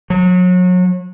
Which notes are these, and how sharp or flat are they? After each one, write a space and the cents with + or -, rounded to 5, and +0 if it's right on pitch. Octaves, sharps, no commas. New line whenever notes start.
F#3 -30